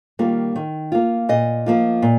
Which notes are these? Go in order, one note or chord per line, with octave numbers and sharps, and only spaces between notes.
D#3 G3 A#3 F4
D#3
A#3 F4
A#2 D#5
F3 A#3 F4
A#2